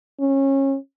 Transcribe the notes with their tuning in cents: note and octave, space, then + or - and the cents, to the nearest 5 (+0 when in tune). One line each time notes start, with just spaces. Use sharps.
C#4 -25